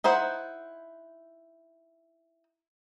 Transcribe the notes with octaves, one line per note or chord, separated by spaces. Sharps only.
D#4 E4 C5 F#5